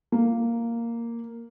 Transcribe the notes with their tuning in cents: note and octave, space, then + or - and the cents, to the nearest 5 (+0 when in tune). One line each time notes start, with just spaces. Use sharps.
A#3 -5